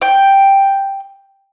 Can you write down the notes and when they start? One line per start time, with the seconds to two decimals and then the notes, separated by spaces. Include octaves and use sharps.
0.02 G5